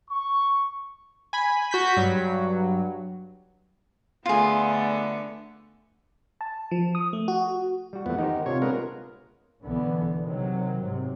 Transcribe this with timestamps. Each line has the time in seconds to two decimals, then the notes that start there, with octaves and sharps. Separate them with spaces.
0.10 C#6
1.33 G#5 B5
1.71 F#4 G6 B6
1.97 G2 F#3
4.26 D3 A3 B3 F4 G#4
6.41 A5
6.71 F3
6.95 D#6
7.13 A3
7.28 F#4
7.93 G3 F#4
8.06 E2 F3 A3 B3 F#5
8.18 D#3 D#4 G4 C5
8.46 C3 D4 F4 C#5
8.62 G#3 B3 A#4
9.63 B1 D3 E3 B3
10.22 C3 D#3 F#3
10.83 G#2 C3